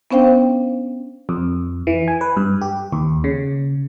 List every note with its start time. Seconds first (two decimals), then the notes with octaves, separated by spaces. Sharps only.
0.11 B3 C#4 D4 C5 F5 G5
1.29 F2
1.87 E3
2.08 G#5
2.21 B4
2.37 G2
2.61 G4
2.92 D#2
3.24 C#3